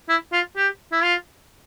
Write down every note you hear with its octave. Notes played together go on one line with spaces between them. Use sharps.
E4
F4
G4
E4
F4